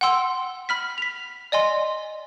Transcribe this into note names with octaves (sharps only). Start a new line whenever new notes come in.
F#5 G5 C6 E6
B5 F6 B6
B6 F7
D5 D#5 G#5 C6